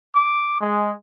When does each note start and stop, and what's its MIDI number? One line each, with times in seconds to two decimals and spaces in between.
0.15 0.59 86
0.60 0.92 56